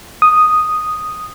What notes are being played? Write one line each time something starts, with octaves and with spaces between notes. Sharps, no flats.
D#6